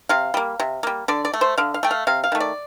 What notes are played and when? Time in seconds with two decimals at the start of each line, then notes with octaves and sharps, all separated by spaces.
0.09 C3 F5
0.34 G3 A#3
0.60 C3
0.83 G3 A#3
1.08 D3 D5
1.25 D5
1.33 A3
1.41 C5
1.58 D3 F5
1.74 F5
1.83 A3 G5
1.91 F5
2.07 C3 F5
2.24 F5
2.32 D#3 A3
2.40 D5